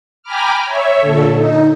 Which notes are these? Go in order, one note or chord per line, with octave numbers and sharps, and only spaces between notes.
G5 G#5 A#5 B5 D6 F6
C#5 E5
A#2 D3 A4
D#4